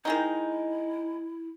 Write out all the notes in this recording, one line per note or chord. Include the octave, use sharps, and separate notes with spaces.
D#3 G#3 D#4 E4